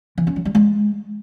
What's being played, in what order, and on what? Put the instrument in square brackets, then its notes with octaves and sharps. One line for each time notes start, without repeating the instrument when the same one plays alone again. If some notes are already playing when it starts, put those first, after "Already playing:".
[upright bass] E3
C#4
F#3
G3
G#3